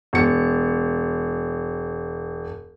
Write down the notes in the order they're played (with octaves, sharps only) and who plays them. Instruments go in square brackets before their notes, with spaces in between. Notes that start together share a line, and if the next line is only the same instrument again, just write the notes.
[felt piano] E1 C#7